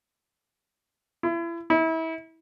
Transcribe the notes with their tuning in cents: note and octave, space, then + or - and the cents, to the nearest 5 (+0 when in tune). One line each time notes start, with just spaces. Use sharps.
E4 +35
E4 -30